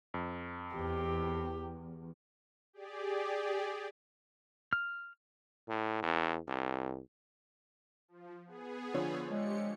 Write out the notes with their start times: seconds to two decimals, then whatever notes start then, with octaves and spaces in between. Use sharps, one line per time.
0.14 F2
0.75 E2 G4
2.73 G4 G#4 D5
4.73 F6
5.69 A2
6.03 E2
6.48 C2
8.08 F3
8.45 B3 G#4
8.94 D3 F3 C#5
9.30 G#3 G4 C#7